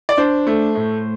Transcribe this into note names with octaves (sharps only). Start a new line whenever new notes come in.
D5
D4 C5
A3
A2